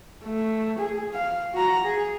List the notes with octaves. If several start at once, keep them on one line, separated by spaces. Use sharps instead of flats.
A3
G#4
F5
F#4 A#5
G#4